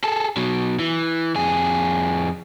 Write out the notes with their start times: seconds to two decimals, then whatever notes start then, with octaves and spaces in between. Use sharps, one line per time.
0.04 G#4 A4
0.37 B2 F#3
0.79 E3
1.36 F2 G#4